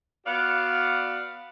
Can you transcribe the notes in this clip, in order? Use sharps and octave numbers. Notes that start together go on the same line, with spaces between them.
B3 F#4 D5 F5